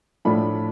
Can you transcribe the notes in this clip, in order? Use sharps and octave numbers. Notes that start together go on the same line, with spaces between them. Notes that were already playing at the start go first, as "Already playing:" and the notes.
A2 F3 A3 D4 F4 B5